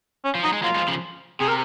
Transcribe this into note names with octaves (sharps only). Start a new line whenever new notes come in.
C#4
F3
F#3 D#4
G#3
F#3 A#3 F4
F3 G#3
C#3 F3
C3 G#4
A#4